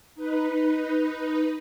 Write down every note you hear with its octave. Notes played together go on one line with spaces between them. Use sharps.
D#4 B4